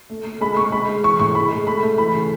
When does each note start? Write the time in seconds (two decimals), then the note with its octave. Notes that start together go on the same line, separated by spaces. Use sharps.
0.10 A3
0.25 A3
0.41 G#3 B5
0.57 G#3 C#6
0.72 G#3 B5
0.88 G#3
1.03 E3 C#6
1.19 A2 C#6
1.35 G#3 B5
1.51 G#3
1.67 A3 B5
1.83 A3
1.98 E3 B5
2.14 C#3